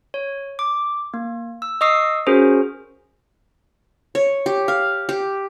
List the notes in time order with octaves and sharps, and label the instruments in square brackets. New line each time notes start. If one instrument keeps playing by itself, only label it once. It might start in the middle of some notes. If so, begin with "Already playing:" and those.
[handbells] C#5
D6
A#3
E6
D#5 C#6 D#6 E6 C7
C#4 F#4 G#4 A#4 C5
[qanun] C#5
G4
F5
G4